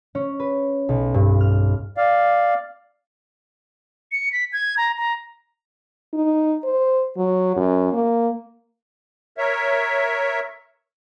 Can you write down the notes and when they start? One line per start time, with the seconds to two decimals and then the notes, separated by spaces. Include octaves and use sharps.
0.15 C#4
0.40 B4
0.89 B1
1.14 G2
1.41 F6
1.97 D5 F5
4.12 C#7
4.32 B6
4.53 G#6
4.77 A#5
4.98 A#5
6.13 D#4
6.64 C5
7.17 F#3
7.56 F#2
7.93 A#3
9.38 A#4 C#5 E5